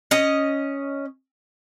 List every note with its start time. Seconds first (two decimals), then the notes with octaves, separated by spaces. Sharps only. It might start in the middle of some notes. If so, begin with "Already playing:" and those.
0.11 C#4 D#5